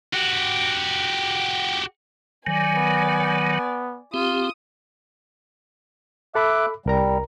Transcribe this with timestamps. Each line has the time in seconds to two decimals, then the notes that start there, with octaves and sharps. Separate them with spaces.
0.14 F#4 G4
2.47 D#3 F#3 D5 G#5
2.77 B3
4.14 C4 F4 G4 D#6
6.35 A4 E5 B5 D6 F#6
6.86 C2 G3 A#4 A#5